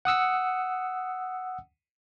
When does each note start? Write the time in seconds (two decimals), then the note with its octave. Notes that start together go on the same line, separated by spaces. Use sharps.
0.05 F#5 D#6 E6 C#7